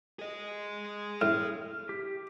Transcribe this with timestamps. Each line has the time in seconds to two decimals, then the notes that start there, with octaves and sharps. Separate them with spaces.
0.19 G#4 D#5
1.21 A2 F6
1.89 G4